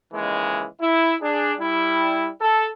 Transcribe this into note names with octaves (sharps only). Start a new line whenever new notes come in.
D#2 C#3 E3 G#3
E4
D4 G#4
G3 E4
A4